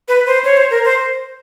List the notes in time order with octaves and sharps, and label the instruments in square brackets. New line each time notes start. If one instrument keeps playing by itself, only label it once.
[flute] B4
C5
C#5
C5
A#4
C5